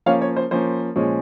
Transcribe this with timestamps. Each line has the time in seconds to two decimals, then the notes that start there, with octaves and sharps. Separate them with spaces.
0.06 F3 A#3 C#4 C#5 F5
0.22 C#5
0.36 C5
0.51 F3 A#3 C#4 C5
0.96 A#2 F3 G#3 C#4